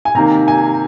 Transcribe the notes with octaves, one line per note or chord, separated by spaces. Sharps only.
G#5
C3 D#3 A#3 A#5
G#5